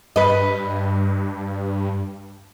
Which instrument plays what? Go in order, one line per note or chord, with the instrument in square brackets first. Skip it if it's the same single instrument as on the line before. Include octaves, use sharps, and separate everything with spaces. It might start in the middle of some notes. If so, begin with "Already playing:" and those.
[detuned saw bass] G2 [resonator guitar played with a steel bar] B4 D#5